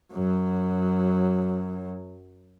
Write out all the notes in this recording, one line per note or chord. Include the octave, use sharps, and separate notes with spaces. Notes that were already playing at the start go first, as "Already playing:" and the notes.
F#2 F#3